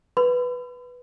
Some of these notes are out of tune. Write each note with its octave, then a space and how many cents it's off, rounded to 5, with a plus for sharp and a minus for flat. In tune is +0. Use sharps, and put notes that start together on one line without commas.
B4 +0 B5 +40